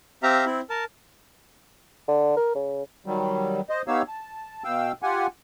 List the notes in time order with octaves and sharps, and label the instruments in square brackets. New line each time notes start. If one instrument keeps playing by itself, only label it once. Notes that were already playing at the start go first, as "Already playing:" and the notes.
[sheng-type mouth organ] C4 G4 E5 F5 A#5
C4 E4
A#4 A5
[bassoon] D3
A#4
C#3
[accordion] D#3 F#3 G3
C5 D#5
B3 D#4 G4 C#5 F5 E6
A5
B2 F5 G5 E6
F4 G4 F#5 G#5